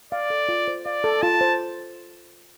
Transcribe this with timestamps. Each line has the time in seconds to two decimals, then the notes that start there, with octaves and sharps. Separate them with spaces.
0.12 D5 F5
0.30 A4
0.49 F4
0.68 C5
0.86 D5 F5
1.04 A4
1.22 F4 A5
1.41 C5